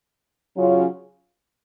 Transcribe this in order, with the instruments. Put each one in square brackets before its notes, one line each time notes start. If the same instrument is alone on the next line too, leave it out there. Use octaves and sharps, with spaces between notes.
[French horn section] C#3 F#3 C#4 F4